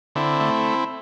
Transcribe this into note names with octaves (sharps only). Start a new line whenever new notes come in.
D3 C4 E4
A3